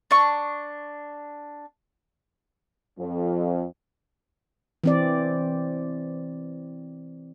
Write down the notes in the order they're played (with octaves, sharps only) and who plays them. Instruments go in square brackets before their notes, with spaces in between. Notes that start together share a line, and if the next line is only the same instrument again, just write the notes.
[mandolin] D4 C#6
[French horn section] F2
[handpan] E3 C4 D5